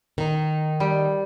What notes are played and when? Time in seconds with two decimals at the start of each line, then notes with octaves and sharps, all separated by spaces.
0.18 D#3 D#4
0.80 G3